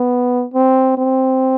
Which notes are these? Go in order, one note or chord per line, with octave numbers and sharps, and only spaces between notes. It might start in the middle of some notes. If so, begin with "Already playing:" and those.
Already playing: B3
C4
C4